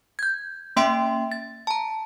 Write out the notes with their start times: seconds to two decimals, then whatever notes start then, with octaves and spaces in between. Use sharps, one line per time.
0.19 G6 G#6
0.76 A#3 C#4 E5 G5 C6 D7
1.32 A6
1.67 A5 A#5